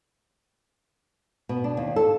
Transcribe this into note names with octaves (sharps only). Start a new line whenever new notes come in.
B2
D4
D#2
A4